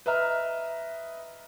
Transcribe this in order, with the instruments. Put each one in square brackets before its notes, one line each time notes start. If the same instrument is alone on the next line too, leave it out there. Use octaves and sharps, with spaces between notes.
[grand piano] B4 D#5 E5 A#5 F6